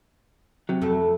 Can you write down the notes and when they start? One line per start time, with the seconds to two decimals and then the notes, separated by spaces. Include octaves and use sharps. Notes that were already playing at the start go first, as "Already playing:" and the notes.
0.69 C3 F#3
0.82 F2 A3 A4